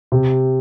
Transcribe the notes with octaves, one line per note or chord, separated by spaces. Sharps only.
C3